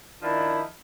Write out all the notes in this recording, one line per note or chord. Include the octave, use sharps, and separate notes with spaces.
D#3 F3 D4 E4